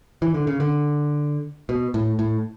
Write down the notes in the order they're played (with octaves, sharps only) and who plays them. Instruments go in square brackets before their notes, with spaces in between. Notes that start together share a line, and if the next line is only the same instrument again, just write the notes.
[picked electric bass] E3
D3
C#3
D3
B2
A2
A2